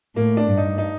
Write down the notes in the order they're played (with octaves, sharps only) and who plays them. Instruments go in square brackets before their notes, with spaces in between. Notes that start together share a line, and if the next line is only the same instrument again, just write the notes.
[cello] A2 [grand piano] A#3
[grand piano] D4
[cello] G2
[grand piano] D#4
D#4